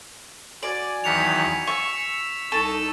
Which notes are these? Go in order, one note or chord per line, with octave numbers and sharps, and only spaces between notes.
F#4 D5 G#5
E2 D#3 F#3 B6 C#7 F7
C#6 E6
C2 D#4 A4 C#6